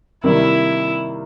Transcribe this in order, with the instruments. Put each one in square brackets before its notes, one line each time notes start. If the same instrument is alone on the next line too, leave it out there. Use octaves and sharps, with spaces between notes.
[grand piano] C3 D#3 G3 A#3 [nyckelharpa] E4